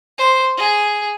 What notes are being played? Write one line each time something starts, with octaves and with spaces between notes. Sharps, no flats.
C5
G#4